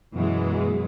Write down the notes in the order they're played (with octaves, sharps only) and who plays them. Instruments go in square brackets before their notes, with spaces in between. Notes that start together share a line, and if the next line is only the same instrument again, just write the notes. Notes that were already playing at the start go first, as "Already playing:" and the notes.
[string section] F#2 B2 E3 F#3 G#3